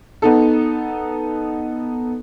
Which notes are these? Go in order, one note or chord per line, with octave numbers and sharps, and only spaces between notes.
B3 D#4 A4